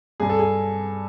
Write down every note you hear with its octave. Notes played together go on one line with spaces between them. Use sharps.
G2 G#4
A4
G#4